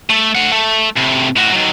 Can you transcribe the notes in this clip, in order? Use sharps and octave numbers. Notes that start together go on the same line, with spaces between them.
A3
A3 F#5
A3
A2 C3
A2 F#4
D#3 F#3